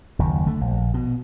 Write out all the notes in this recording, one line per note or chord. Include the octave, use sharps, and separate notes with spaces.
F#1 D#2
D3 A3
A#1
B2